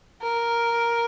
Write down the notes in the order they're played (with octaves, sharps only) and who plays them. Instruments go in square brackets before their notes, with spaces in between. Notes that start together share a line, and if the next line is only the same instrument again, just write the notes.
[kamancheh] A#4